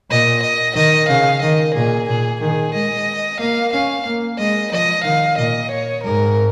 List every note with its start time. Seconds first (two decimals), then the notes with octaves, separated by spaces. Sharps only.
0.10 A#2 D#5
0.43 D#5
0.76 D#3 D#5
1.09 C#3 F5
1.42 D#3 D#5
1.75 A#2 G#4
2.09 A#2 G#4
2.41 D#3 G#4
2.74 G#3 D#5
3.39 A#3 F5
3.73 C#4 F5
4.06 A#3
4.38 G#3 D#5
4.72 F3 D#5
5.04 D#3 F5
5.37 A#2 D#5
5.71 C#5
6.04 G#2 A#4